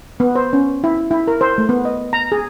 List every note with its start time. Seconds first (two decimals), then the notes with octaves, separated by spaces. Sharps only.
0.20 B3
0.35 C5
0.53 C#4
0.84 E4
1.11 E4
1.27 A#4
1.41 C5
1.58 A3
1.69 B3
1.85 D#5
2.13 A#5
2.32 G#4